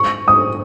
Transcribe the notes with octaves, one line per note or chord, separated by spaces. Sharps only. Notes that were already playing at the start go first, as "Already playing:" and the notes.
Already playing: C#6
D#6